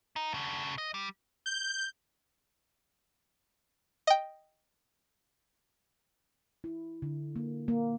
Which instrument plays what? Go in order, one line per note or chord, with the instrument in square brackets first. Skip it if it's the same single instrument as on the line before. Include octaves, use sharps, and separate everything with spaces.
[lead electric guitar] D#4
C#3 D4
D#5
G3
[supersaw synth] G6
[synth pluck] D#5 G5
[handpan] E4
D3
A#3
A#3